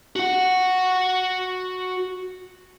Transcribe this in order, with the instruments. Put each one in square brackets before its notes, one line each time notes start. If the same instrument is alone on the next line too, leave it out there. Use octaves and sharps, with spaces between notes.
[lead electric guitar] F#4 F#5